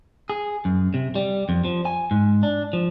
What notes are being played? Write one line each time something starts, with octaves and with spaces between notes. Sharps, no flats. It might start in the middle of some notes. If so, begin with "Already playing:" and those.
G#4
F#2
C3
G3
F2
F3
G#5
G#2
D4
F3